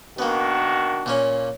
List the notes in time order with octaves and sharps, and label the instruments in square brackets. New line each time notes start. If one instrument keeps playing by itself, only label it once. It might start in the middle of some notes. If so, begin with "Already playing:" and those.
[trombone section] D#3 D4 F#4 [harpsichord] A#3 B3
[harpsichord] A#2 A#3 C#4